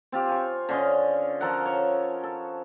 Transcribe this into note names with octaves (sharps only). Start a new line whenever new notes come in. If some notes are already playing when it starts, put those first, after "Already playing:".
C4 F4 G4
G#5 C#6
D3 C#4 D#5
F3 A4 A#4 F#5
C#5
A4